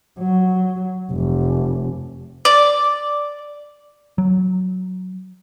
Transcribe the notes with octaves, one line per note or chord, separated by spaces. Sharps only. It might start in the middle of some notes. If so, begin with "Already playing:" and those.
F#3
F1
D5
F#3